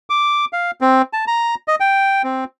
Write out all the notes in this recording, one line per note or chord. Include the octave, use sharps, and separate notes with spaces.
D6
F5
C4
A5
A#5
D#5
G5
C4